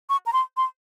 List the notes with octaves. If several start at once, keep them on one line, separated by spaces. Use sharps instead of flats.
C#6
A#5
C6
C6